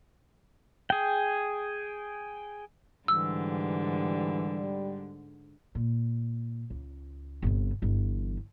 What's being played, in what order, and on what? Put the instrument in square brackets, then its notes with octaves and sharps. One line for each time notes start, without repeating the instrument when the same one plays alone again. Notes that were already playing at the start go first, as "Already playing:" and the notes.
[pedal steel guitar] G#4 G5
[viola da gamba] G#2 D3 [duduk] E3 [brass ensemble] G3 [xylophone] E6
[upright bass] A#2
C#2
G1 C3
G1 E3